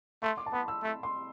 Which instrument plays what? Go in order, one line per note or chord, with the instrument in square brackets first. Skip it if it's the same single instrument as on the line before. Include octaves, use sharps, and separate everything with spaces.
[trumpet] A3 [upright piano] C6
[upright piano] D6
A5
[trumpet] B3 [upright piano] B5
[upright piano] E6
[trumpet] A3
[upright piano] C6